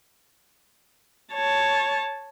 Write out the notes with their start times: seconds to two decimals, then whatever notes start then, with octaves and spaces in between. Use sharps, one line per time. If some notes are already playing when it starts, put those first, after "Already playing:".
1.33 C#5 A5